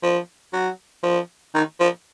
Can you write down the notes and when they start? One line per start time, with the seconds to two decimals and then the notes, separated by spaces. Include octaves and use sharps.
0.03 F3
0.53 F#3
1.03 F3
1.54 D#3
1.80 F3